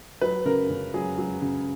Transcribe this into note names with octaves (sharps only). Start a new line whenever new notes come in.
F#3 B4
C#3 A#4
C#3
F#3 G#4
F#3
C#3